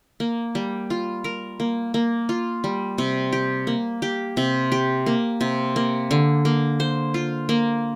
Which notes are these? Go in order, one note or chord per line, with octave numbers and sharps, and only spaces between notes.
A#3
G3
F4
A#4
A#3
A#3
F4
G3
C3
G4
A#3
G4
C3
G4
A#3
C3
A#3
D3
A#3
C5
F4
A#3